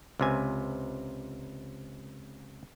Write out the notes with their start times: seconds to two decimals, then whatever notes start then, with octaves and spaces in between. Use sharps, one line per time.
0.20 C#2 C3 G#5